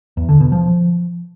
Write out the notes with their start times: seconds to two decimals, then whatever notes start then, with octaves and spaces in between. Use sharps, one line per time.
0.17 E2
0.29 D3
0.40 B2
0.52 F3